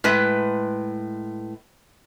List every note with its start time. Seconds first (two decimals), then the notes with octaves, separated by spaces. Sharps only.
0.04 A2 G#3 B4